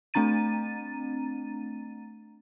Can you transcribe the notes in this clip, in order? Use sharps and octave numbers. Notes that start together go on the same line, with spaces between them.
A3 C4 D4 A#5 A6 D#7